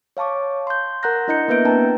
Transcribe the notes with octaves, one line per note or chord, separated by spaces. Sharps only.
C#5 F5 A5 C#6 D6
C6 G6
A#4 F#5 A#5 F#6 G6 A#6
D4 E4 D#5 A#5 G6 C#7
A#3 B3 B4 E5 G6 D7
C4 D4 B4 G5 A5 A#5